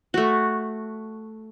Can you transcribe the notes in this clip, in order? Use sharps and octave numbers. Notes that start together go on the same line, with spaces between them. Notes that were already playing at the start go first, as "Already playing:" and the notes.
A3 F#4